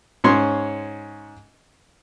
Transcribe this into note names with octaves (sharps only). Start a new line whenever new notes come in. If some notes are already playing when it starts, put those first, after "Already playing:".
G#2 C#4 C#5 C6